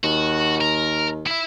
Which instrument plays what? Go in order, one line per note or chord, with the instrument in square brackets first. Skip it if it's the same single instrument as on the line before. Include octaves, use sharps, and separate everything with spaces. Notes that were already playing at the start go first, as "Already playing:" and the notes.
[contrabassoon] D#2 [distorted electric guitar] F#4
[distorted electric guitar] A#4
E4 E5